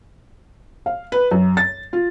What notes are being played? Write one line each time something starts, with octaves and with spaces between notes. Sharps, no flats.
F5
B4
F#2
A6
F4